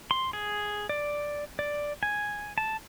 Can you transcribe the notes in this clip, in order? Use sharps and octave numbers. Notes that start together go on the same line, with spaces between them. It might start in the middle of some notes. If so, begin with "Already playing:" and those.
C6
G#4
D5
D5
G#5
A5